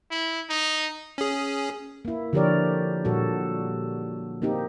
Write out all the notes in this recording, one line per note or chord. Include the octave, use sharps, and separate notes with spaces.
E4
D#4
C#4 G#4
A#3 E4
D3 F3 G4 A#4 C#5 D5
A#2 G3 F#4 A4
A#3 C4 D#4 G4